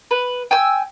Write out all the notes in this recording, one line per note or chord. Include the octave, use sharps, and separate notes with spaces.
B4
G5 G#5 E6